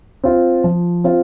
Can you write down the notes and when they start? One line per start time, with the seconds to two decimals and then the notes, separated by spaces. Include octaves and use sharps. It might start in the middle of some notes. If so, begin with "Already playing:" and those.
0.24 C4 F4
0.64 F3
1.04 C4 F4